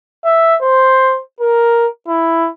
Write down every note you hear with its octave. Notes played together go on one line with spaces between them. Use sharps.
E5
C5
A#4
E4